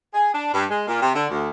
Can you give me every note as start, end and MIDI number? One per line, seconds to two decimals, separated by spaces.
0.14 0.32 68
0.34 0.52 62
0.54 0.65 43
0.70 0.86 56
0.87 1.00 46
1.02 1.15 48
1.15 1.28 50
1.30 1.50 38